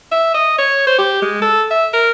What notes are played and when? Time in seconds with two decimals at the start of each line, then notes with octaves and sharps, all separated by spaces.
0.11 E5
0.34 D#5
0.58 C#5
0.87 C5
0.98 G4
1.22 G#3
1.42 A4
1.71 E5
1.93 A#4